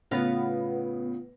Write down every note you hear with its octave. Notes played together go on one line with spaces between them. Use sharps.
A2 C#3 B3 F4 F5 A#6